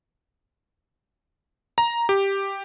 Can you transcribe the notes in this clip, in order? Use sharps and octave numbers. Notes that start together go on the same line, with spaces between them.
A#5
G4